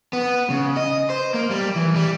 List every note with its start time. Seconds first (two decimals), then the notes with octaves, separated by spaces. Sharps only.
0.13 B3
0.50 C#3
0.77 D#5
1.10 C5
1.34 A#3
1.51 G3
1.76 E3
1.96 G3